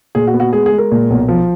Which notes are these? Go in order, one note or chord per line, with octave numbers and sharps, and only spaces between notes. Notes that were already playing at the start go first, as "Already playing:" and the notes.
A#2 G#4
F#4
B3
F#4
G#3 G#4
G#4
G#3
A#4
A#2
B1
F3